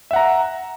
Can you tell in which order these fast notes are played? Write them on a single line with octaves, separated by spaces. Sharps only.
E5 F#5 A#5